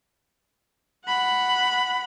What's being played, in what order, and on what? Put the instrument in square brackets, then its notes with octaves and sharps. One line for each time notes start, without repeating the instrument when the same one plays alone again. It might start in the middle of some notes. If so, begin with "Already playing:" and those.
[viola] F#5 B5